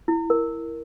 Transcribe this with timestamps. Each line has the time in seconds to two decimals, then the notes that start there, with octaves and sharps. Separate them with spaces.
0.08 E4
0.30 A#4